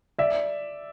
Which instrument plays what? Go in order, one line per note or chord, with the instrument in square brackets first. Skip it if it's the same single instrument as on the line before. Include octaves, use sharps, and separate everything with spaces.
[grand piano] D5 E5